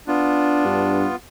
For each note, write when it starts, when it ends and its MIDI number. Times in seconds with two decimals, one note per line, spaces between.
0.08 1.16 59
0.08 1.11 62
0.08 1.16 65
0.65 1.07 43